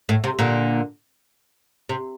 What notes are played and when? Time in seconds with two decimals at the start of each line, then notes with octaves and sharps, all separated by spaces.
0.09 A2
0.24 C3
0.39 A#2 D3
1.89 C3